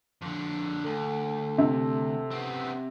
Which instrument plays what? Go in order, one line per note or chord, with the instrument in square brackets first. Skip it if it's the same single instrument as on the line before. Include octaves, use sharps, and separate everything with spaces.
[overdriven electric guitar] F2 D3
[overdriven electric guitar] D2 [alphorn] A4
[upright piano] C3
[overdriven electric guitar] B3 C4